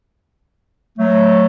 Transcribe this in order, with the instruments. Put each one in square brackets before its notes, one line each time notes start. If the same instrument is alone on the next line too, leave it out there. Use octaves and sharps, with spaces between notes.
[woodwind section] F#3 A3